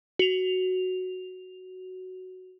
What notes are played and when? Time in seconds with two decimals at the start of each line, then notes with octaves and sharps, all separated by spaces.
0.19 F#4 F7